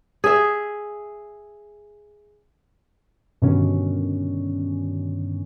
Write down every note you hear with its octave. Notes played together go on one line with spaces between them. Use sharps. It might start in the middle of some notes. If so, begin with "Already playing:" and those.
G#4 E5
G2 B2 D3 D#3 C#4